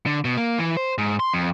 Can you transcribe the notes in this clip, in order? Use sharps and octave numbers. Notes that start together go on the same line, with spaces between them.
D3
B2
A#3
E3
C5
G#2
C6
F2